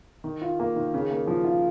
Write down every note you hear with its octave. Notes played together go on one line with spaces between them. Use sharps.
D#3
F4
A#3
D#3
C#3
A#3
F3
F4